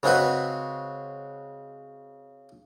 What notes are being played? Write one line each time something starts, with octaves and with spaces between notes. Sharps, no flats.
C#3 G#3 C4 F#4 B4